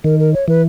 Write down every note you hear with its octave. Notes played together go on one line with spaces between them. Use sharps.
D#3 A#4
A#4
C#5
E3 B4